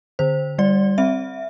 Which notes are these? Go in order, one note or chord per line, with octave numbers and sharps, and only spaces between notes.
D3 C5
G3 D5
C4 E5